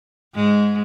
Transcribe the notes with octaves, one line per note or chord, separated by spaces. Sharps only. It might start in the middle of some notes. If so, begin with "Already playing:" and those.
G#2 G#3